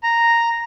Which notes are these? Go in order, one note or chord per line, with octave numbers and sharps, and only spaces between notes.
A#5